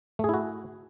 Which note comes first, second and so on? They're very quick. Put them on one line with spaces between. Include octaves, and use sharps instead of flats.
A3 G#4 E4 F#4